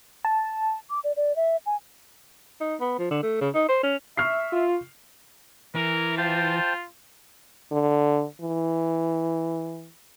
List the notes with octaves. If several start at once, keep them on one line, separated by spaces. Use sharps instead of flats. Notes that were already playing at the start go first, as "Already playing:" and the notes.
A5
D6
D5
D5
E5
G#5
D#4
B3
F3
D3
A3
C#3
D#4
C5
C#4
E5 C#6 F6 C7
F4
E3 A#4
F4 C5 G5 A5
D3
E3